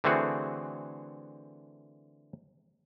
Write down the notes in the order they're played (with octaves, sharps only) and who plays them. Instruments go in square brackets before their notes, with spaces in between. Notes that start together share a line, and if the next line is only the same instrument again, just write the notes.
[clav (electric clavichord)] D3 E3 A3 C4 F#4 G#4